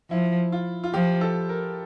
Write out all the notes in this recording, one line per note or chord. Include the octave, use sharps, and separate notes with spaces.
F3 E4
F4
F4
F3 G4
A4
A#4